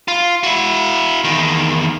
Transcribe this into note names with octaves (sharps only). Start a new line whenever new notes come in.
F4
E4 F#4
E2 D#3